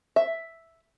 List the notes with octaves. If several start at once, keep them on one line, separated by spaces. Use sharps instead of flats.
E5